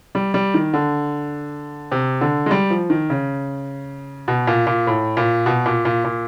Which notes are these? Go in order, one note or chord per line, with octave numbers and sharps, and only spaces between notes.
G3
G3
D#3
D3
C3
D3
G#3
G3
F3
D#3
C#3
B2
A#2
A#2
A2
A#2
B2
A#2
A#2
A#2